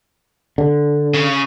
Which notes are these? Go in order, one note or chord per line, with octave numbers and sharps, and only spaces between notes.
D3
C#3